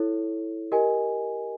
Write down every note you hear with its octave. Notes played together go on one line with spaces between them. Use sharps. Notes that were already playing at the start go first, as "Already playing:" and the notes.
Already playing: E4 A4 C#5
G4 A#4 D#5 G#5